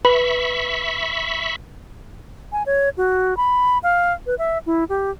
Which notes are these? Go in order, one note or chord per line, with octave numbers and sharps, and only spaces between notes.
B4 E5 B5 C#6
G#5
C#5
F#4
B5
F5
B4
E5
E4
G4